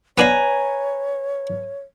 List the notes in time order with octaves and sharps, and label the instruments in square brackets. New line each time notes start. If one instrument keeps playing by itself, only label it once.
[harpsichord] B3 D4 F5 [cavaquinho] B4 G#5 A#5 [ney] C#5